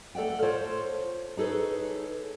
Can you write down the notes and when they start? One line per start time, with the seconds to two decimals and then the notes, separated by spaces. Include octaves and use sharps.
0.15 A3 A4 D5 F#5 G5
0.42 F4 A4 C5 C#5
1.37 D#4 G#4 A4 B4 C#5